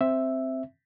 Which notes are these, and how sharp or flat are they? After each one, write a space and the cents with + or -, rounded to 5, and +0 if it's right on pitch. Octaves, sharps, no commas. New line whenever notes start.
C4 +0 E5 +0